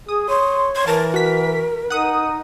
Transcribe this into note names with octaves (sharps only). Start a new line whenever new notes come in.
G#4 D#6
C#5 C6
C6 G#6
E3 A#4 A5
F#4 B6
D#4 F#5 D#6